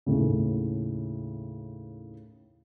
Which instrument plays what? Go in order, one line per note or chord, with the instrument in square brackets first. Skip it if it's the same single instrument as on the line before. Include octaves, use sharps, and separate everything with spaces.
[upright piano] D#2 A2 C#3